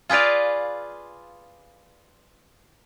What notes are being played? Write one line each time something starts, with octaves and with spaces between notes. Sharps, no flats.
F4 G#4 B4 D5 F5